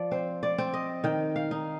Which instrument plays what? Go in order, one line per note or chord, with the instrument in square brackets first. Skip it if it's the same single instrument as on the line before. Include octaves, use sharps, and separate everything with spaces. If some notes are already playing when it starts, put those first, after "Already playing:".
Already playing: [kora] F3 D5
C4 C5
D5
C4
D#5
D#3 G5
F5
D#4